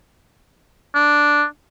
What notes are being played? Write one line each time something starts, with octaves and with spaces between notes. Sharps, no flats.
D4